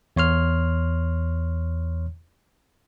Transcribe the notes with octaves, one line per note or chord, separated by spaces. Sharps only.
E2 C#5 C6 F6